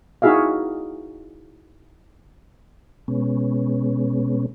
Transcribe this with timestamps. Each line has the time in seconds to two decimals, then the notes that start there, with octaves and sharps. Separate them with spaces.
0.22 D#4 E4 F#4 G#4 E5 F5
3.08 B2 G#3 B3 C#4